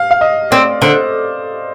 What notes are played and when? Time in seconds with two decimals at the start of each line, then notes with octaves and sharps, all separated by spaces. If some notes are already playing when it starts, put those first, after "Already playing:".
Already playing: F5
0.11 F5
0.21 D#5
0.51 C4 D5
0.82 D3 C5